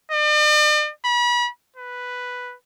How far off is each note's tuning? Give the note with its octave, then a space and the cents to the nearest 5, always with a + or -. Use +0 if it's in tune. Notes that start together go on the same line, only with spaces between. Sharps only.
D5 +45
B5 -35
B4 +0